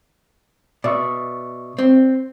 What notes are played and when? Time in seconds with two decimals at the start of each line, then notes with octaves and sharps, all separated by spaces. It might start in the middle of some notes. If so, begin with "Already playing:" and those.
0.84 B2 D5 E5 C#6
1.79 C4